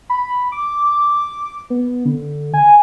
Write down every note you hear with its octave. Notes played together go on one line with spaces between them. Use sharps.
B5
D6
B3
D3
G#5